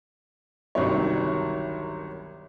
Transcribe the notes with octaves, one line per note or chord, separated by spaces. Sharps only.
G1 C2 D#3 F#3 C#5